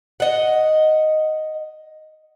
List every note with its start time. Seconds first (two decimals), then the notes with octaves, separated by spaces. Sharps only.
0.20 D#5 F#5